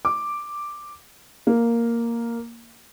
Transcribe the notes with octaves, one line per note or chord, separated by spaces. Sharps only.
D6
A#3